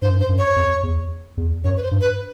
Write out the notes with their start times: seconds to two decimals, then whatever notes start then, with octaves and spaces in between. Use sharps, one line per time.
0.02 G2 C5
0.10 F#2
0.17 G2
0.20 C5
0.29 F#2
0.38 C#5
0.56 F2
0.83 E2
1.37 E2
1.64 F#2 C#5
1.77 B4
1.83 C5
1.91 G2
2.01 B4